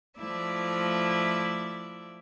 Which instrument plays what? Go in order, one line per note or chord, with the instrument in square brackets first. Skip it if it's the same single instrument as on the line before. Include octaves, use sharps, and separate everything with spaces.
[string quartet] F3 A3 E4 D5 E5